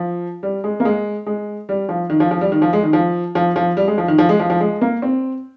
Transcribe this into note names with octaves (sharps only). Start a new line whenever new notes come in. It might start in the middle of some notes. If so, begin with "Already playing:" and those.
Already playing: F3
G3
G#3
A#3
G#3
G#3
G3
F3
D#3
F3
F3
G3
D#3
F3
G#3
D#3
F3
F3
F3
G3
G#3
F3
D#3
F3
G#3
F3
F3
G#3
A#3
C4